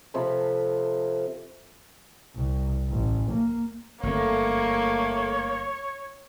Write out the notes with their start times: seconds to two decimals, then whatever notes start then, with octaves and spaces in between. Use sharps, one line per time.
0.14 C3 F3 A4 B5
2.36 C2
2.90 A1
3.31 A#3
4.03 G1 F#2 A3 A#3 C4 C#5